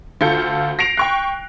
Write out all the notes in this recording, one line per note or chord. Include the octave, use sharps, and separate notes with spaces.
D2 F4 A4 G6 C#7
A#6 C7 D7 F7
G5 C#6 F#6